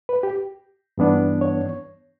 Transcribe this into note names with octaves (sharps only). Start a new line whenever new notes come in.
B4
G4
G2 E3 B3 D4
C#5